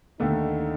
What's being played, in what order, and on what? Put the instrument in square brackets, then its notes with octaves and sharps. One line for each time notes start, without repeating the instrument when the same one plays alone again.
[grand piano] D#2 D3 A3 [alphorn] D#4